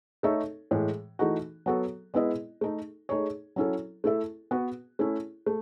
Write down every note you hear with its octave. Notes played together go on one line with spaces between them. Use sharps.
A3 D#4 A4 C#5 E5
A2 E3 G#3
E3 A3 D#4 F#4
F#3 B3 F#4 A4
G#3 B3 E4 B4 D#5
A3 D#4 A4
A3 D#4 G#4 C#5
F#3 C#4 E4 A4
A3 E4 A4 E5
B3 F#4 B4
A3 C#4 E4
A3